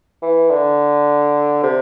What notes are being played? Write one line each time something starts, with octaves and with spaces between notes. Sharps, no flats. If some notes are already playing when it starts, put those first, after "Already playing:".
E3
D3
C3